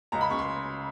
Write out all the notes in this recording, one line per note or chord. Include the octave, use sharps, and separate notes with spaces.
C#2 A#5
B5
C#3 C#6
C6